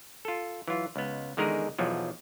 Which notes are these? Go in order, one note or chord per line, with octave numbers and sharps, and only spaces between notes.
F4 A4
E3 F#3 F4
C#2 B3
E2 D3 D#3 G#3 G#4 A#4
B1 E2 F3 F#3